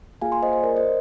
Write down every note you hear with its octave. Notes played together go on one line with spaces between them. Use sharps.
A#3 F4 G#4 F5 G#5
G#5 C6
C5 D#5
C5
A#4 D5
C5 D#5